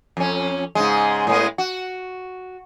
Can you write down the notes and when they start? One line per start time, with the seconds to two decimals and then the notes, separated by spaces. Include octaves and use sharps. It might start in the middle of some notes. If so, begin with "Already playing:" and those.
0.17 F2 C#4
0.75 G#2 C#3 G#3
1.27 A2 G#3 B3
1.58 F#4